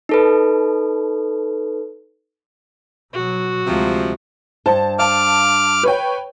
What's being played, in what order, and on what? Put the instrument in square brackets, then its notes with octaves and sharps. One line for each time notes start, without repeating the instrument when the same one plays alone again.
[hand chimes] D#4 A4 B4
[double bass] B2 F#3 [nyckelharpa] F#4
[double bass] D2 G#3 [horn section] C3 F3
[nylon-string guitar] G2 C5 [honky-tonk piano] A5
[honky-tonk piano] F5 A5 [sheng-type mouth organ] D6 F6
[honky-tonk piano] B4 C#5 G5